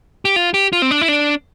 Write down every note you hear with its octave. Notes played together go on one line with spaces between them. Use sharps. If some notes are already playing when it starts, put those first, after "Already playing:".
G4
F4
G4
F4
C4
D4
E4
D4